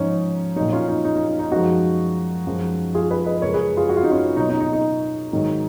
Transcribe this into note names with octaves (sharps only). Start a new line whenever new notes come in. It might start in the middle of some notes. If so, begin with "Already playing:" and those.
Already playing: G#2 F3 G#3 C#4 D#4
A#2 F#3 D#4
C#4 F4
D#4
D#4
D#4
D#4
D#4
F#2 F3 G#3 D#4 F#4
F#2 F3 G#3
F4 G#4
G#4 B4
B4 D#5
F#2 C#3 G#3 A#4 C#5
G#4 B4
F4 G#4
F#4
F4
D#4
C#4 F4
B2 F#3 D#4
D#4
D#4
D#4
G#2 D#3 F#3